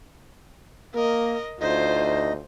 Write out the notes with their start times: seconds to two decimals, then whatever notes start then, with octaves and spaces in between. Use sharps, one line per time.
0.95 A#3 A#4 D#5
1.61 D2 D#4 F4 C5 D#5